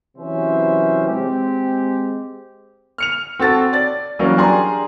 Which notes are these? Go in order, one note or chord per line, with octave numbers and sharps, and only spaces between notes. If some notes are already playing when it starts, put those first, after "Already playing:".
C3 E3 F#3 C#4 C5 E5
G#3 C4 G4
F6 C#7 F7
C4 F#4 A4 A5 A6
D5 A6
E3 F#3 G3 A#3 C#4
D4 G4 G#4 D5 A#5 C6